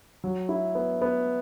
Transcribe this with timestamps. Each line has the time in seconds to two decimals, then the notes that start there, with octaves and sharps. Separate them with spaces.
0.24 F#3
0.49 E4
0.75 B3
1.02 B3